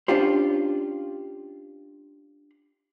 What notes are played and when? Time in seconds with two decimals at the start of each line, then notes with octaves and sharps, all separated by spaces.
0.08 C#4 D4 F4 G4 C5